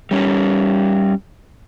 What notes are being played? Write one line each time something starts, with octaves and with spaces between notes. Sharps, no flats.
G3 C#4